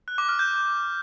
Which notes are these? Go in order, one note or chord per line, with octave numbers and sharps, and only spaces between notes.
F#6
D6
F6
G6